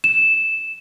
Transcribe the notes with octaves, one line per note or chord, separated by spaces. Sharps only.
E7